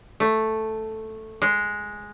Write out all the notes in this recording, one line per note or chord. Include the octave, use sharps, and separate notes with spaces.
A3
G#3